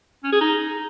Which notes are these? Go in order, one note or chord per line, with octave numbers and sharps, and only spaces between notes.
C#4
G#4
D#4